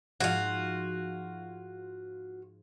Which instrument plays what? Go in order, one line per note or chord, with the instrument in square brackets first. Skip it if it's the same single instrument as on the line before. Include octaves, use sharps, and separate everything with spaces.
[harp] G#2 F3 G#6 [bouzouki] F4 F#4